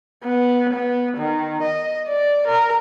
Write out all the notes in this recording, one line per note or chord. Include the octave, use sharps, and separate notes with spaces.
B3
B3
D#3
D#5
D5
A#4